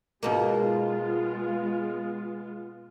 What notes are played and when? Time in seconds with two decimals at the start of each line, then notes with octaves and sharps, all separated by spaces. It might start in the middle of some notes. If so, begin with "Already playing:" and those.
0.23 G#2 B2 G#3 A#3 B3 F4